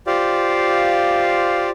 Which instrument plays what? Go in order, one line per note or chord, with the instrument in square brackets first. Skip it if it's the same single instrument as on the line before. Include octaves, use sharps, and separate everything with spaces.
[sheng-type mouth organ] F4 G4 C5 D5 F5